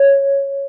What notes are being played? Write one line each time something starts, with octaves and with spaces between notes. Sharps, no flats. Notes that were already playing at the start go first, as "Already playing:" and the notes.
Already playing: C#5